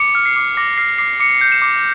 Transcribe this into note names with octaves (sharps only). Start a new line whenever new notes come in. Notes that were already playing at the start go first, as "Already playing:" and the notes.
Already playing: D6 C#7
F6
C7
D6
D6 A#6
F6 C7
D6 C7
D6 C#7
G6
E7
D6